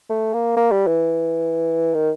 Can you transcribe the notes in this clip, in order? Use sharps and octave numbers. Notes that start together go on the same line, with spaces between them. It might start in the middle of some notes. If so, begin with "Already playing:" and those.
A3
A#3
A#3
G3
E3
D#3